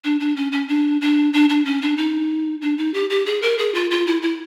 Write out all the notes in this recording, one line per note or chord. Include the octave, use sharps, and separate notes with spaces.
D4
D4
C#4
C#4
D4
D4
D4
D4
C#4
D4
D#4
D4
D#4
G4
G4
G#4
A#4
G#4
F4
F4
E4
E4